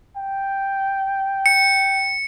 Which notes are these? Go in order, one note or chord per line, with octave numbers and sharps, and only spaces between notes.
G5
C#7